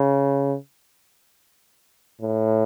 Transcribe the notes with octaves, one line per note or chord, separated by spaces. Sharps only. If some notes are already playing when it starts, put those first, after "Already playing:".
Already playing: C#3
A2